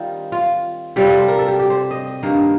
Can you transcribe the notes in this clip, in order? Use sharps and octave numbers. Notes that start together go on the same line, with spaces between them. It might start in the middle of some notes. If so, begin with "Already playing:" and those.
Already playing: D#3 G3 C4 F4
F4
C3 G3 C4 F4 G4
A4
C5
A#4
A4
G4
G4
C5
D#5
D#5
G2 D#3 A#3